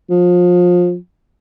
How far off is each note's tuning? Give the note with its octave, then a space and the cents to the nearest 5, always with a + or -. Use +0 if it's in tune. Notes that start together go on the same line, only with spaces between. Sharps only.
F3 +25